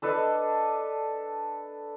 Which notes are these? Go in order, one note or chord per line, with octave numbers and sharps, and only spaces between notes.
D4 A4 B4 D#5